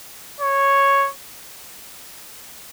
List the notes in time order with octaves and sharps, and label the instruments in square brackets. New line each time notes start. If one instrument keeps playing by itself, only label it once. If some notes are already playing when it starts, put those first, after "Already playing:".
[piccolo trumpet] C#5